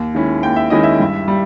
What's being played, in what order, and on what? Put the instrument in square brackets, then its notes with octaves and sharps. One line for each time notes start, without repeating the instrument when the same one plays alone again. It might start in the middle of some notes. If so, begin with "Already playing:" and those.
Already playing: [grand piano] D#2
D#3 G#3 C#4 E4
D#2 G5
E5
D#3 G#3 C#4 E4 D#5
E5
G2
G3